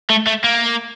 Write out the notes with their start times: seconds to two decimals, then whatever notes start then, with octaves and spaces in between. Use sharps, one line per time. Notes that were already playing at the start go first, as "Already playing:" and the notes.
0.10 A3
0.26 A3
0.44 A#3